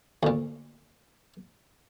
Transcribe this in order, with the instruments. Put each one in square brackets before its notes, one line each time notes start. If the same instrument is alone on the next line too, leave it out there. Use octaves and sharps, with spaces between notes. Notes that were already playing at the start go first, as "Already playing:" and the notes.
[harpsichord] D2 A#2